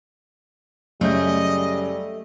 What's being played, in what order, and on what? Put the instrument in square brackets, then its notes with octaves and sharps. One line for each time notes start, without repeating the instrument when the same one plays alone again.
[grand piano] F#2 C#3 G6 [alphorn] G3 [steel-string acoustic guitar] A3 [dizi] D#5